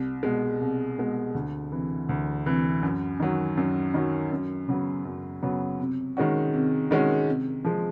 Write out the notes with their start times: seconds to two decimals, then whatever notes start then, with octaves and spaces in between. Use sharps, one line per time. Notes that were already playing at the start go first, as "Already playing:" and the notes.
Already playing: C2
0.23 B2 G#3
0.61 C2
0.98 B2 G#3
1.35 D2
1.72 C3 E3
2.09 D2
2.45 C3 E3
2.83 F#2
3.20 D#3 F#3
3.57 F#2
3.94 D#3 F#3
4.32 F#2
4.68 C#3 F#3 B3
5.05 F#2
5.43 C#3 F#3 B3
5.79 C3
6.17 D#3 G#3 C#4 F#4
6.53 C3
6.91 D#3 G#3 C#4 F#4
7.28 C3
7.65 F3 G#3